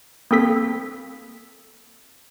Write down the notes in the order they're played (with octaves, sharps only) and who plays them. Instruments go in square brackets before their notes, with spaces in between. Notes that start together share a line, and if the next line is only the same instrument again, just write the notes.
[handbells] A#3 C4 A4 B6